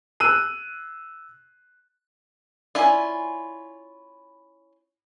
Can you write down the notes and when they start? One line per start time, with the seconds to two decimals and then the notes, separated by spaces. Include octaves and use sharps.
0.20 E6 F#6 D#7
2.75 C#4 E4 F4 D5 G#5